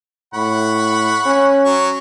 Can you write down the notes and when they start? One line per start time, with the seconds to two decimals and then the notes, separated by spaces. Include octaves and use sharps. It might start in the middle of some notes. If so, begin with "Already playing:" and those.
0.34 A2 F#5 B5 C#6
1.26 C#4
1.64 F#3 C#6